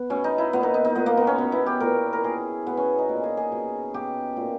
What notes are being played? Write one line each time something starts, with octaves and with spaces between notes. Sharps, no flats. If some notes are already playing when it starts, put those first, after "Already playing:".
Already playing: B3
B2 C#4
D#4
E4
A#2 B3
D#4
D#4
D#4
A#2 B3
A#3
B3
C#4
B2
E4
G4
A#2 A#4
A#4
B2 G#4
B2 B3
C#4
D#4
A#2
G#4
G#4
B2
B2 G4
A#2